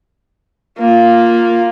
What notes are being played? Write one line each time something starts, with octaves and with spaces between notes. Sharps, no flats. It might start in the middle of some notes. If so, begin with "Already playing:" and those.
A#3 F4